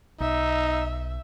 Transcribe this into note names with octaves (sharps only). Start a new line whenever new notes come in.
B1 D#4 E5